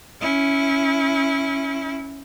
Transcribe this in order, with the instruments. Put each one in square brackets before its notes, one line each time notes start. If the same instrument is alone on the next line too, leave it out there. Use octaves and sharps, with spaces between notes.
[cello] C#4 E4